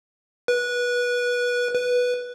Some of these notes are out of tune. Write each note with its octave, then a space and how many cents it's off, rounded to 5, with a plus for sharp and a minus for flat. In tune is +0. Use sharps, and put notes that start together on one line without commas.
B4 -20
B4 -5